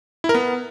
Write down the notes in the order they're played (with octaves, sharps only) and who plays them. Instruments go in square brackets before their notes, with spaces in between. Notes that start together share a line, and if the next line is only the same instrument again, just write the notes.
[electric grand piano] E4
A#4
B3